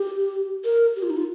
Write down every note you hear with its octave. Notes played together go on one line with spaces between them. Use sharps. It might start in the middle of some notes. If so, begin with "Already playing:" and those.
Already playing: G4
A#4
G4
F4
D#4
F4